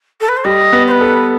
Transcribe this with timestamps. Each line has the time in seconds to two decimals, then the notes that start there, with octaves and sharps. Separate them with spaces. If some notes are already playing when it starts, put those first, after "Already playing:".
0.20 A4
0.28 B4
0.36 C5
0.44 G3 D#5
0.73 B3
0.87 C5
0.91 B4
1.01 A4